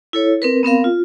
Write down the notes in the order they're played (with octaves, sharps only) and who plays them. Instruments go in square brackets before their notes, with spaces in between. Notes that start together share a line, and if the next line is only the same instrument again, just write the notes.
[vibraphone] E4 A4 C#5
C4 A#4 B4
B3 C4 A#4 F5
F4